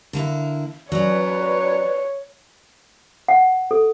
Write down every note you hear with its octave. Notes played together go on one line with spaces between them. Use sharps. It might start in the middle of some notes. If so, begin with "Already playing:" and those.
D3 A#3 E4
F#3 C#4 B4 C#5 D5
F#5
A4